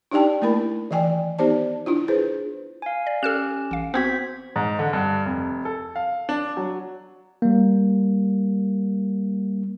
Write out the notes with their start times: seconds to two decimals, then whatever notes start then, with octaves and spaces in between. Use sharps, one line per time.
0.11 D4 D#4 G4 D5 G5 A5
0.42 A3 A#3 E4 A#4 B5
0.91 D#3 E3 D5 G5 G#5
1.39 B3 D#4 G4 C5 D5 A5
1.86 D4 E4 F4
2.08 G#4 B4 C5
2.82 F5 G#5
3.07 D5
3.23 C#4 G4 A4 F6 E7
3.71 A1 F5
3.94 B3 C4 F#4 C5 G#6 B6
4.56 G#2
4.79 D3
4.93 G2
5.26 F1
5.65 A4
5.96 F5
6.29 D4
6.57 F#3
7.42 G3 A#3